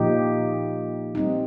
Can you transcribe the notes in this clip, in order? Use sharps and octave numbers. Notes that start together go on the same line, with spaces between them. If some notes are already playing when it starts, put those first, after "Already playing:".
Already playing: A#2 F3 D#4 G4
G3 C4 D#4